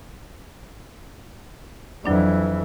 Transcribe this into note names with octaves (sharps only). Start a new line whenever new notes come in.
F2 E3 F#3 D4 D5